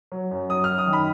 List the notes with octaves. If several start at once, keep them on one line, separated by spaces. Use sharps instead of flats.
F#3
F#2
F#3 D#6
F6
F#2
D#6
D#3
B5